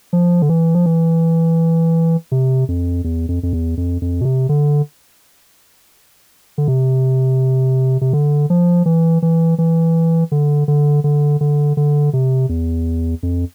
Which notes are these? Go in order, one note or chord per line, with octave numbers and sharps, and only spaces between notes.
F3
D3
E3
F3
E3
C3
F2
E2
F2
F2
E2
F2
F2
B2
C3
D3
D3
C3
C3
D3
F3
E3
E3
E3
D3
D3
D3
D3
D3
C3
E2
F2